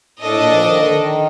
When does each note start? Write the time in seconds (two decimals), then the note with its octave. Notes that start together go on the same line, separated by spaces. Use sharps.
0.20 A2 D4 A4 D#5
0.35 A#2
0.50 F3
0.66 D#3
0.79 D3
0.92 D#3